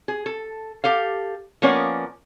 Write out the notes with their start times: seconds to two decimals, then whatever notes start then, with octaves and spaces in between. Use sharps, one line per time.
0.08 G#4
0.26 A4
0.84 G4 A4 F5
1.62 F3 A#3 B3 C#4 A#4 D5